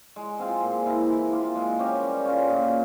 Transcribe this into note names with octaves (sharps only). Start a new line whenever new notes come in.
G#3
C4 F4 G#4
A#2
G#3 E4 A#4
E3
A#3 F4
G#3
C#4 G4 A#4
G3
C#4 F4
A#2